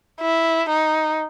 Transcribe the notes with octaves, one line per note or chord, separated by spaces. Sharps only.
E4
D#4